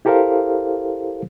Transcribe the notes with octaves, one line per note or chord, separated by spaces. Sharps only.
E4 G4 A4 A#4 C5 F5